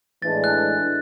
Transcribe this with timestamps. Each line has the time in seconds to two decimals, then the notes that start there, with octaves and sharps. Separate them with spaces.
0.22 A2 E3 G#3 D4 A6
0.44 F#6